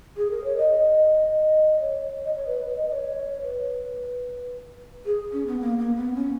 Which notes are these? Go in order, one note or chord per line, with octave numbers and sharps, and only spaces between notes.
G#4
A#4
C#5
D#5
C#5
D#5
C#5
B4
B4
D#5
D#5
C#5
B4
G#4
C#4
B3
A#3
A#3
B3
C#4